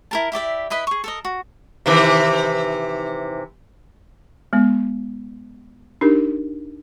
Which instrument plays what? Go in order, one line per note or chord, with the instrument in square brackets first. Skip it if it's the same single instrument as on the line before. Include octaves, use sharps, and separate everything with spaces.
[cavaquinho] E4 A#4 A5
E4 G4 D5 E5
E4 B4 D#5 B5
G#4 C#6
A4 A#4 D#5
F#4
[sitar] C3 D#3 E3
[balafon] G#3 B3
D4 D#4 G4 A#4